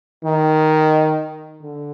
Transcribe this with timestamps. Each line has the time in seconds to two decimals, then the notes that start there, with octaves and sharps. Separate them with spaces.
0.24 D#3
1.62 D3